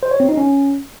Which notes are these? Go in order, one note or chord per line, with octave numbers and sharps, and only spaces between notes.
C5
C#5
C4
D#4
C#4